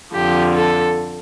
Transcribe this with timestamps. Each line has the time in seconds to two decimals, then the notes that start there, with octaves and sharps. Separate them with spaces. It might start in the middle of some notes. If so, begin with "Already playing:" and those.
0.14 F2 D3 F3 G4
0.55 A4